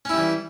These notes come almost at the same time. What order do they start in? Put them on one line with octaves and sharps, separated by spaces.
C#4 E4 G3 E3